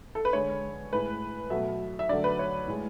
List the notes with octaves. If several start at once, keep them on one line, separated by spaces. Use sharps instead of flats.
A4
B4
D3 G#3 C#5
A2 G#3 B4
B2 F#3 A3 E5
E5
D3 F#3 A3 D5
B4
C#5
A2 G#3